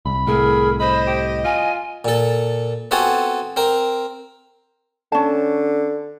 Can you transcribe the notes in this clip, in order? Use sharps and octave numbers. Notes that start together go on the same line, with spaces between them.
C2 B5
C2 A2 G#4 A#4
C5 D#5 B5
G4
F4 G#5
A#2 A4
B3 C4 F4 F#4 A4 G#5
C4 A#4
D3 C#4 A5